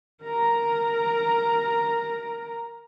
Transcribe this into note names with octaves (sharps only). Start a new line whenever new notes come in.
A#4 A#5